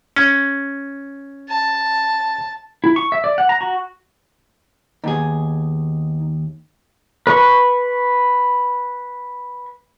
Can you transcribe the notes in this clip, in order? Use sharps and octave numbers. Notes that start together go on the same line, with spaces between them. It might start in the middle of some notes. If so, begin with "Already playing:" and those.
C#4
A5
E4
C#6
E5
D5
F#5
A#5
F#4
D#2 B3 D#4 G#4
B4 C#6